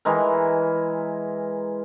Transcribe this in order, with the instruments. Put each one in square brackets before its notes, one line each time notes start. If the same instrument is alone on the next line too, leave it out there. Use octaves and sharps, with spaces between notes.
[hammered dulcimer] E3 G#3 A#4